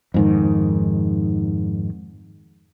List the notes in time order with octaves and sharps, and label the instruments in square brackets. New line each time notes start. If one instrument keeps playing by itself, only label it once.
[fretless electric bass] F2 G#2 D#3